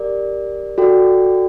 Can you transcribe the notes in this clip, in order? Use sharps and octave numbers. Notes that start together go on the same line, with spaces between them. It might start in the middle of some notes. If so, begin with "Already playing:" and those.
Already playing: G4 A#4 D5
F#4 A4 D5 G5